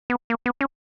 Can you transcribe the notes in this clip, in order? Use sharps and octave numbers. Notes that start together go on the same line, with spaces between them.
B3
A#3
B3
C#4